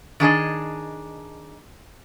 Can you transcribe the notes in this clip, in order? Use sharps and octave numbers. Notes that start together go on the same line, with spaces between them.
D#3 D4 G#4 D#5